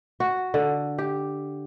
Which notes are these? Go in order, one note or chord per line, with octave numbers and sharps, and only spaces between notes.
F#4
D3
G4